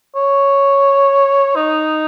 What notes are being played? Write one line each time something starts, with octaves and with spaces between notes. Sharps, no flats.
C#5
D#4